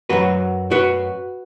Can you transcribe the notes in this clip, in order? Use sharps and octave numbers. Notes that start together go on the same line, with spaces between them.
F#2 F#3 F#4 B4
F#4 B4